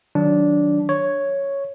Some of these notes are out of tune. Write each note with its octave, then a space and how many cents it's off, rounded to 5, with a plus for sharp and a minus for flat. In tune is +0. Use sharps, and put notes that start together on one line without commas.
D#3 +0 F#3 +0 D4 -10
C#5 +0 C#6 +0